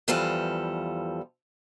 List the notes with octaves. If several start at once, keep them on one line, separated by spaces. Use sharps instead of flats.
E2 E3 F3 G3 A4 F5